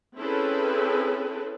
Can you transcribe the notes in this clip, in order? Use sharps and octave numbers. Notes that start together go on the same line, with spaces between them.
C4 C#4 E4 G#4 A4 B4